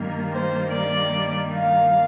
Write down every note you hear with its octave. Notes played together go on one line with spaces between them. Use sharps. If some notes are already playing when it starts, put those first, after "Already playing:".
Already playing: G2 D#3 G3 A#3
C5
D5
F5